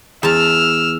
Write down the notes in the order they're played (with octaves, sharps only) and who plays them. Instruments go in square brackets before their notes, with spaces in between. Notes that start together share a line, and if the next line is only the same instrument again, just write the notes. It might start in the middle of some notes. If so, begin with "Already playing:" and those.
[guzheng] E2 A5 [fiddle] E6 F6